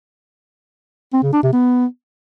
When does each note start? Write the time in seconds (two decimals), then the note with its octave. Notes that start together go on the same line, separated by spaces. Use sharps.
1.13 C4
1.23 C#3
1.33 D4
1.43 C3
1.52 B3